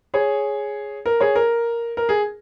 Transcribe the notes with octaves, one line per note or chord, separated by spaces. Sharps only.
G#4 C#5
A#4
G#4 C#5
A#4
A#4
G#4